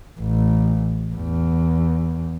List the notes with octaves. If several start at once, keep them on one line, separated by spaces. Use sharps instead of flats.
A1
E2